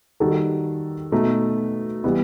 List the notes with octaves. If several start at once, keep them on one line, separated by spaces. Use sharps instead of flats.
D#3 G3 D#4 F#4 A4
B2 A3 D#4
E3 G3 B3 E4